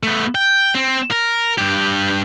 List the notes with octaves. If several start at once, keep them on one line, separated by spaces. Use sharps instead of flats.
A3 B3
G5
C4
A#4
G2 G4